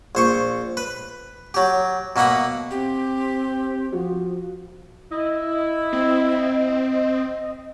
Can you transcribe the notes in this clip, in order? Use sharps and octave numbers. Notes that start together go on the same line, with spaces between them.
A#1 C5 C#6
B4
F#3 G4
B2 A#3 E5 F#5 B5
C4 G4
F3 F#4
E4 D#5
C4